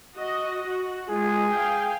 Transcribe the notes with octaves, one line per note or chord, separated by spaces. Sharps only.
F#4 D#5
F#4
G#3 F4 G#4
F5 G5